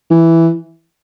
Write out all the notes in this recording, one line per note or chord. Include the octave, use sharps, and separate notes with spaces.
E3